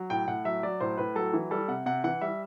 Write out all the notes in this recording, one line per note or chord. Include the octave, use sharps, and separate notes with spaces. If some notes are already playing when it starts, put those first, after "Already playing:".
Already playing: F#3
A2 G5
A2 F#5
F#3 E5
F#3 D5
A2 C5
A2 B4
F#3 A4
E3
G3 A4
C3 F#5
C3 F#5
E3 F#5
G3 E5